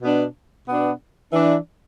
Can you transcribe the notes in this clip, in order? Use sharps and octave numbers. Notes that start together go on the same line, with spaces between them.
B2 B3 D4
B2 B3 D4
E3 D4